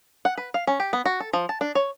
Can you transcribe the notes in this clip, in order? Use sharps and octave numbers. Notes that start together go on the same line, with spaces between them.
F#5
B4
F5
C#4
G4
B3
F#4
A4
F3
A5
D4
C#5